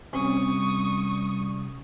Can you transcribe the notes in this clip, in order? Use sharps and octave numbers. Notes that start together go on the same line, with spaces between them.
C3 G3 C#4 C#6 D#6